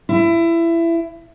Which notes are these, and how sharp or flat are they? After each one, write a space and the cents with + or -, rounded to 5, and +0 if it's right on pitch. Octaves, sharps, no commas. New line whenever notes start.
E4 +20